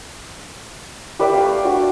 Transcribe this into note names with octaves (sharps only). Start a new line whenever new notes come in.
G4 B4 D5 E5
A3 B4 F5
D4 F#4